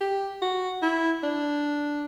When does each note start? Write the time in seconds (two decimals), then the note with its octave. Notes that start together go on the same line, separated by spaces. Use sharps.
0.01 G4
0.42 F#4
0.82 E4
1.23 D4